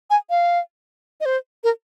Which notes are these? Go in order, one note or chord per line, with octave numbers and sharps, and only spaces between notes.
G#5
F5
D#5
C5
A#4